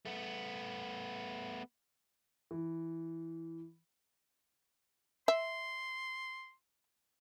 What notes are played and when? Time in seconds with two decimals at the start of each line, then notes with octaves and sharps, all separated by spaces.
0.05 A3 B3
2.51 E3
5.28 E5 C6